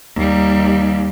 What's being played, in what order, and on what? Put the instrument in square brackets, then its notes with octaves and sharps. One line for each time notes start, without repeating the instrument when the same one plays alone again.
[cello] D#2 G3